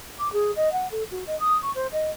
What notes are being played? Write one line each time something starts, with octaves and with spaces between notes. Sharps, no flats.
D6
G#4
D#5
F#5
A4
F#4
D#5
D#6
C#6
C5
D#5